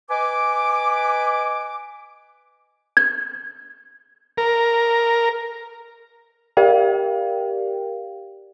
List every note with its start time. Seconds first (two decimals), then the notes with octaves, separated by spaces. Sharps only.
0.10 B4 D#5 G#5 D6
2.97 G#6
4.38 A#4
6.57 G4 A#4 D5 F5 G5